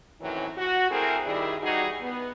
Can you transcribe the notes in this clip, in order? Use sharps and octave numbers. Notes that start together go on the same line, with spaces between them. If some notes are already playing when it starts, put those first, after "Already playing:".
F#2 A2 D#3 E3 F#3 C4
F#4
A3 C4 E4 G#4 A#4
G2 D#3 G3 E4 G#4 D5
E3 G3 D#4 F#4 G#4 D5
B3